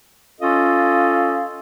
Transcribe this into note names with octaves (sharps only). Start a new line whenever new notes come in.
C#4 F4 A4 D#5 F5